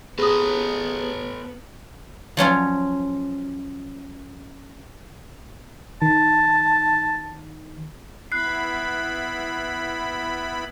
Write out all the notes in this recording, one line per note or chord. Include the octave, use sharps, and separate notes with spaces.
B3 G#4 A4 B4 D#6
F3 F#3 C#4 F4
D#3 A5
B3 E4 B5 F#6 C7